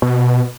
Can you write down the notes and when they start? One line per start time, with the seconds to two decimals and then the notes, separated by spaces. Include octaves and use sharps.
0.02 B2